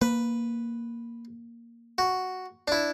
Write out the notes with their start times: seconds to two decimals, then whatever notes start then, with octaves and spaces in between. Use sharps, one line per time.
0.02 A#3 B4
1.98 F#4
2.68 D4 E4